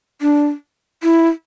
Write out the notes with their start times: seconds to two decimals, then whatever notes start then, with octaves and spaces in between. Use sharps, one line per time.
0.22 D4
1.03 E4